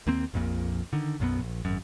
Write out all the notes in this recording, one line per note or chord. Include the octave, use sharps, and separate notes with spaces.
D#2 A#3 C4
A#1 F2 A#2
D3 D#3
B1 F#2 B2 B3
A#1
G#1 F#2